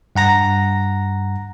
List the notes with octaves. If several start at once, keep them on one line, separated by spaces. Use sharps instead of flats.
G2 F#5 A#5 A#6